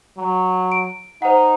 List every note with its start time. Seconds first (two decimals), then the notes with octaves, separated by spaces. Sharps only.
0.17 F#3
0.72 D7
1.22 D#4 C5 F#5